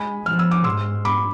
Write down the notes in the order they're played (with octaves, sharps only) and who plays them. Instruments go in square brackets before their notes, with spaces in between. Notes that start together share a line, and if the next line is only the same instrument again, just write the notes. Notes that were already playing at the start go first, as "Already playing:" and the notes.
Already playing: [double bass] G#3 [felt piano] G#5 B5
[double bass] F3 [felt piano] F6
[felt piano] E6
D6
[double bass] G#2 [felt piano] C6 E6
[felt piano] B5 D6